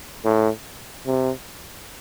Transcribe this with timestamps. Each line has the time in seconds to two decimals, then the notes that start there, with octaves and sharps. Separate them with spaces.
0.25 A2
1.06 C3